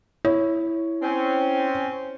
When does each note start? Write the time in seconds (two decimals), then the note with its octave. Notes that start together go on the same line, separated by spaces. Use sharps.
0.25 E4 C#5
1.03 C4 C#4